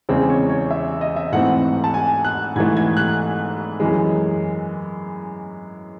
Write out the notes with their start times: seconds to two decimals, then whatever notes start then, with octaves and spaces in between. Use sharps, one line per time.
0.09 E2 C#3 G#3 C4 C#5
0.30 C#5
0.49 C#5
0.71 E5
1.01 D#5
1.16 E5
1.32 G#2 E3 A3 C4 F#5
1.84 A5
1.94 G#5
2.24 F#6
2.55 G#2 E3 A3 G#6
2.77 G#6
2.97 F#6
3.80 F#2 E3 G#3